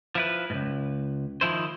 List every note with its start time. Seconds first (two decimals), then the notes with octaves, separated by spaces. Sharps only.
0.15 F3 E4 B4
0.50 C#2 G#2
1.41 D#3 F3 E4 C5